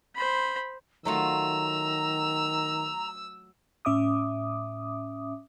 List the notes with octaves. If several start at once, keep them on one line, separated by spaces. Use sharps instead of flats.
C5 B5
D#3 F#3 A3 F4 A#5 E6
A2 C#4 E5 D6 D#6